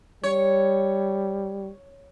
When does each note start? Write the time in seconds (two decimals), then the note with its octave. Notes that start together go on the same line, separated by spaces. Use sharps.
0.24 G3 C#5